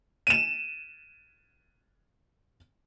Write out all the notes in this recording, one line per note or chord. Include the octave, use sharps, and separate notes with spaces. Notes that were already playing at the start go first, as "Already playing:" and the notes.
D#7 E7